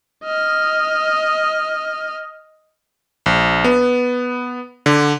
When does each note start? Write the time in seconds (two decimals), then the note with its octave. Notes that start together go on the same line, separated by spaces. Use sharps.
0.24 D#5 F6
3.26 A#1
3.64 B3
4.86 D3